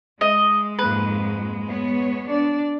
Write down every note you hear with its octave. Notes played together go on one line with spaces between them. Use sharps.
G#3 D#5
F2 G#2 A#3 B4
B3 C#5
D4 D5